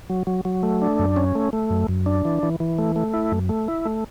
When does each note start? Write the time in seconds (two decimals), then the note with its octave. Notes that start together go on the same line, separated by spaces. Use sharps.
0.10 F#3
0.27 F#3
0.45 F#3
0.63 A3
0.82 D4
0.99 F#2
1.16 C#4
1.35 A3
1.53 A3
1.70 F#2
1.88 F#2
2.06 D4
2.25 E3
2.43 E3
2.60 E3
2.78 A3
2.96 A3
3.14 E4
3.32 F#2
3.49 A3
3.68 E4
3.85 A3